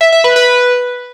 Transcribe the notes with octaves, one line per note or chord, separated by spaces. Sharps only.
E5
E5
B4
B4